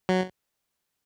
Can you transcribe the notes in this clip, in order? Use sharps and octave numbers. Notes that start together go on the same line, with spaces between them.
F#3